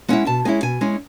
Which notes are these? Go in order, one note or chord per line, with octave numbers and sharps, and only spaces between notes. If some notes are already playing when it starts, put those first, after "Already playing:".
G#3 C#4 E4 F#5
B2 A5
G#3 C#4 E4 G#5
B2 G#5
G#3 C#4 E4